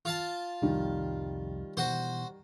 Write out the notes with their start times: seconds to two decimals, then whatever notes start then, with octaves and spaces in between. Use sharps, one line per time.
0.05 F4 F5 A5
0.62 C2 F2 D#3 G3
1.77 B2 E3 F#4 C5